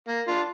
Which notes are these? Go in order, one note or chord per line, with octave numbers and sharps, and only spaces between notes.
A#3
D4 F4